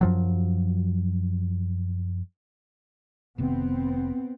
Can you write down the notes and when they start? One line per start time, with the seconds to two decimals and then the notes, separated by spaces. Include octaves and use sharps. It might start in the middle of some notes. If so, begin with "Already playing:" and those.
0.01 F#2 F3 F#3
3.38 F1 C3 D#3 B3 C4